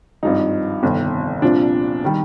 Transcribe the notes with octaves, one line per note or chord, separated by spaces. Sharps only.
G#1 G2 F3 D#4
G1 F2 C3 D#3 G3
C2 A#2 F3 D4
D#3 G3